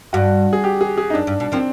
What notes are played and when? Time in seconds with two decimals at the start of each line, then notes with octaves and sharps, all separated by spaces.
0.13 G2 F#4
0.53 G#4
0.64 G4
0.81 G#4
0.98 G#4
1.10 D#4
1.14 F#2 D4
1.27 G2
1.40 B2
1.52 D#3 F3 C4